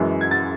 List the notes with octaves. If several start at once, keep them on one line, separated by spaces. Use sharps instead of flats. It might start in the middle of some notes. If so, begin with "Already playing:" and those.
Already playing: F#2 E3 G#3
G#6
A6